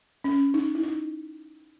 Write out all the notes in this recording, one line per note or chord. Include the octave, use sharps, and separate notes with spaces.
C#4
D#4
E4
D#4